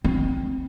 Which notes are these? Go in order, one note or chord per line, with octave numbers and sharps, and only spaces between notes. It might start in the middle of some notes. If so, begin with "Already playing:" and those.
C4